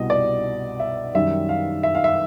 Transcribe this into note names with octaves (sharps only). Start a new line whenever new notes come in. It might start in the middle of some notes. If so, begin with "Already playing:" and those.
Already playing: C2 B2 G3 D#5
D5
E5
F#2 D#3 G3 E5
F5
E5
F5
E5